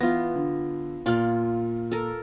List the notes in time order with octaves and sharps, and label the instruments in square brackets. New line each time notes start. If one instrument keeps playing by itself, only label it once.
[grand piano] E3 A#6 [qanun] B3 F4
[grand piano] D3
[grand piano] A#2 F6 [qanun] F4 D5
[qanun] A4 A#4